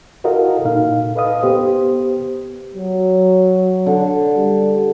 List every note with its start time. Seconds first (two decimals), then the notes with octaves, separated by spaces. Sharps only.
0.24 E4 F#4 A4 A#4 D#5 F5
0.65 A#2 D#4 F5
1.15 A4 B4 D#5 F5 D#6
1.43 B3 G4 C5
2.74 F#3
3.86 D3
4.36 G3